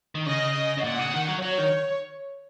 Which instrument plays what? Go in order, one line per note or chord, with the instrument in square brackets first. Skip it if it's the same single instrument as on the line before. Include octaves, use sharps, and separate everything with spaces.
[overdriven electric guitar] D#3
[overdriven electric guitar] C#3 [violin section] D#5
[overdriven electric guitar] C#3
[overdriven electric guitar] A#2 [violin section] F#5
[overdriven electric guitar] C#3
D#3
F#3
[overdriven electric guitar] F#3 [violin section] C#5
[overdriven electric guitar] D#3